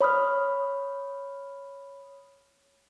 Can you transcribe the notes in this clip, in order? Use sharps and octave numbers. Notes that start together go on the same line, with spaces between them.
C#5 B5 D#6 F6